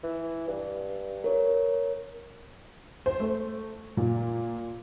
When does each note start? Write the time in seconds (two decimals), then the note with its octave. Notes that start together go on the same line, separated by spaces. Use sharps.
0.04 E3
0.48 G2
1.24 A#4 C#5
3.06 C5
3.20 A3
3.97 A#2